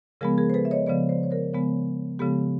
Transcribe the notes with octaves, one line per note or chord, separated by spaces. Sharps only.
C#3 F3 G#3 B3 G#4 A#4
G#4 A#4
C5
A4 B4
E5
C#5 D#5
C#3 F3 G#3 B3 C5 D5
C5 D5
C#5
A#4 C5
C#3 F3 G#3 B3
C#3 F3 G#3 B3 G4 A4